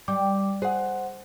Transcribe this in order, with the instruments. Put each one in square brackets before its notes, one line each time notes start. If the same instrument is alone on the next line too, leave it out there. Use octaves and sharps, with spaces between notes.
[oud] G3 [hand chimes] D6
[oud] G#4 [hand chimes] C5 F#5